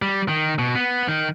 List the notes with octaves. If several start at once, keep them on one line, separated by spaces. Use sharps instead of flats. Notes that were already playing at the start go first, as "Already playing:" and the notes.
G3
D#3
B2
B3
D#3